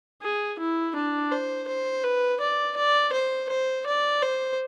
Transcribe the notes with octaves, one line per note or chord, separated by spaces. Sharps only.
G#4
E4
D4
C5
C5
B4
D5
D5
C5
C5
D5
C5